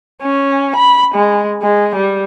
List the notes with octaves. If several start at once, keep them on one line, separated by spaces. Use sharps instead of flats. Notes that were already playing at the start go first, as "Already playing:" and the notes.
C#4
B5
G#3
G#3
G3